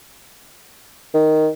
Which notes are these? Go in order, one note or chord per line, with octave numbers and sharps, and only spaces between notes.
D#3